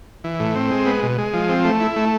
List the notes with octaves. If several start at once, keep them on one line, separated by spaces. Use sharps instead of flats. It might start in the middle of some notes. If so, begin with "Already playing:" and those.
E3
A2
C4
G#3
B3
B2
G#3
F3
C4
A3
E4
A3